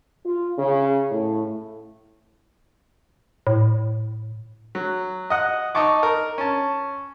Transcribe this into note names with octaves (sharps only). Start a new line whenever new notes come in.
F4
C#3
A2
A2
F#3
D#5 F#5
D#4 D#5 A5 C#6 D6
A#4
C#4 A5